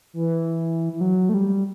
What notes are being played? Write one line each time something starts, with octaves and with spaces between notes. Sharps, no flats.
E3
E3
F#3
A3
G3